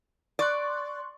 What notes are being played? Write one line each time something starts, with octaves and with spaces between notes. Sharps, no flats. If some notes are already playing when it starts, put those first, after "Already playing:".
D5 C6 C#6 F#6